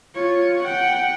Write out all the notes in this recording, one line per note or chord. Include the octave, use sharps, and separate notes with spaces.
F4 C#5
F#5 G5